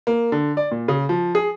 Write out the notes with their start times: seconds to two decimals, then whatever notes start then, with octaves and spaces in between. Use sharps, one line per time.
0.07 A#3
0.32 D3
0.57 D5
0.71 A#2
0.88 C#3
1.09 F3
1.35 G#4